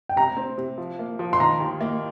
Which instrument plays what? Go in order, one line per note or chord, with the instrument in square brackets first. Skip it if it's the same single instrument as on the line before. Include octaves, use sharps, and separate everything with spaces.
[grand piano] G5
[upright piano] C3 [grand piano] A#5
[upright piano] C4
C3
F3
A#3
F3
[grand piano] C6
[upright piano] D#3 [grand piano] A#5
[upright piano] D#2
A#3